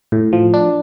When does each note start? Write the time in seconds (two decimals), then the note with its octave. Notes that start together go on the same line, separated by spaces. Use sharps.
0.12 A2
0.33 F3
0.54 D4